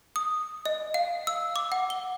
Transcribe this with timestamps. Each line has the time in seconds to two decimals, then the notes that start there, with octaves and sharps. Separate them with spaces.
0.16 D#6
0.66 D#5
0.94 F5
1.27 E6
1.56 D6
1.72 F#5
1.90 G7